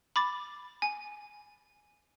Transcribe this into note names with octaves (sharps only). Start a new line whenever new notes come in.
B5 D6 A6
G#5